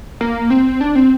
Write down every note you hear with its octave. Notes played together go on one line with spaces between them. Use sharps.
A#3
C4
D4
C4